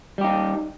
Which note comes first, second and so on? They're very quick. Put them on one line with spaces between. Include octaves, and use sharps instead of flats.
G3 G4 D#4